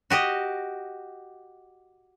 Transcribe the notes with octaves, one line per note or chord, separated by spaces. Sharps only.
F#4 G4 D#5